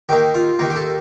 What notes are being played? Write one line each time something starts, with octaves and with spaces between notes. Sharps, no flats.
D#2 D#3 A#3 G4
F4
D#2 D#3 A#3
G4
A4